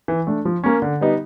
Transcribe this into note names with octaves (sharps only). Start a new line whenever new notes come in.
E3
A3 D4
F3
A#3 C#4
D3
G3 B3 D#4